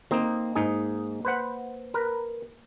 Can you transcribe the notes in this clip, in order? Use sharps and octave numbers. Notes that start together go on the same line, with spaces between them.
A#3 C4 D#4
G#2 D#4 G#4
B4 C5 F#5
A#4 B4